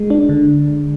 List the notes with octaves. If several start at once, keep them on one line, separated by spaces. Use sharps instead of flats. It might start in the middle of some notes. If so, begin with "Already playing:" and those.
Already playing: G#3
D4
D3